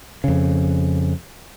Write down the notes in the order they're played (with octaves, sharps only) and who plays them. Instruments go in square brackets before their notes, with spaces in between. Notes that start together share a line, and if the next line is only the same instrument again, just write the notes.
[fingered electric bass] F2 C#3